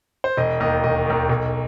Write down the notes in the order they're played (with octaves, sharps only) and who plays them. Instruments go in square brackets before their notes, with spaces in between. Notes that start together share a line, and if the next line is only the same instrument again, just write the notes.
[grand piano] C5
E1 D#5
D#2 D#3 D#5
E1 D#5
D#2 D#3
B1